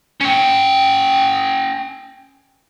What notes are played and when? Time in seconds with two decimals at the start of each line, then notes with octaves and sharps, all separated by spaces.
0.21 C#4 G5